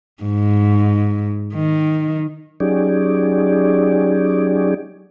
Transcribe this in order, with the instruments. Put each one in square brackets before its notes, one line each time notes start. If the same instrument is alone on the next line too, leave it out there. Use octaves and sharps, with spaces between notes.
[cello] G#2
D#3
[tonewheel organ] F#3 C#4 D#4 G4 G#4 D5